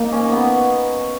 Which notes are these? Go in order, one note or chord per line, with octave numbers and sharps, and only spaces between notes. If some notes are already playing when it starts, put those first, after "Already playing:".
Already playing: A#3 D#4
C#4
B3